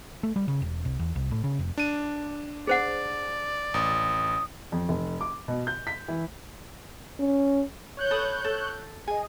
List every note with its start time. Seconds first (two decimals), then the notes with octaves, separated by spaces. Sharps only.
0.23 A3
0.36 G3
0.48 C#3
0.62 E1
0.85 C2
0.99 E2
1.16 C2
1.31 A2
1.44 C#3
1.59 F1
1.78 D4 D#7
2.67 G#4 C5 D5 F#5
3.74 A1 D#6
4.72 F2
4.89 F1
5.21 D6
5.48 B2
5.67 G6
5.87 B6
6.08 E3
7.20 C#4
7.97 C#5 F#6 G6
8.11 A4 B4 D#6
8.44 A4
9.08 G#4 D#5 G#5